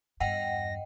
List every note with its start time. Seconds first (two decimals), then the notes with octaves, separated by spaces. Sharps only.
0.20 E2 G2 D#5 F#5 G5 A#6